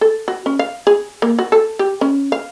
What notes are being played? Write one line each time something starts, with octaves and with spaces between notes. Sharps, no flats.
A4
F#4
C#4
F5
G#4
A#3
F#4
A4
G4
C#4
F5